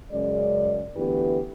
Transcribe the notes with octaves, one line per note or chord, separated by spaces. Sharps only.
F#2 C#3 G#3 D5
D2 E3 B3 E4 G4 B4